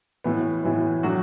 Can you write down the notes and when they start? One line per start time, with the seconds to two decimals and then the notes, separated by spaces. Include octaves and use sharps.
0.24 A2 E3 B3
0.64 A2 E3 B3
1.03 A2 F#3 D4 F#4